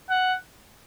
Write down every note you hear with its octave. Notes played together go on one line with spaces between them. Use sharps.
F#5